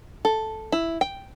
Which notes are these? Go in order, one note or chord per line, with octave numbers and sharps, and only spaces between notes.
A4
E4
G5